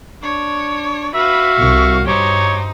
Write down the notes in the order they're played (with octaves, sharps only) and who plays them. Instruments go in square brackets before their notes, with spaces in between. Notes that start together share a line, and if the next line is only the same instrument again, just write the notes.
[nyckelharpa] D4 [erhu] C#5
[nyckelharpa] F#4 F5 [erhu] B4 [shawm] E5
[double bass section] C2 [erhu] C#6
[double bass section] G2 [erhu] D#4 [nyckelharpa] G4 C5 [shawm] C#5